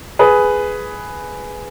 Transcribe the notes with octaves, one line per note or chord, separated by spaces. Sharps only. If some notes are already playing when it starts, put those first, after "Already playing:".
G#4 B4